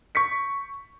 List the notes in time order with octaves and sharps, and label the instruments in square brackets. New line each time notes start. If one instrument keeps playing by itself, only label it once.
[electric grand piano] C#6 G6 B6 C#7